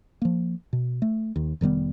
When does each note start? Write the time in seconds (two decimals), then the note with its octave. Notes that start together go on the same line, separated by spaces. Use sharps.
0.22 F3 A#3
0.73 B2
1.02 A3
1.36 D#2
1.61 F1 D#3 G3 B3